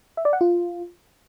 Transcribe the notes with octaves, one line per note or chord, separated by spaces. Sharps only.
E5
D5
F#5
F4